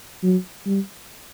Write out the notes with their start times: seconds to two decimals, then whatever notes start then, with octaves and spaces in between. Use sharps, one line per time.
0.24 F#3
0.66 G3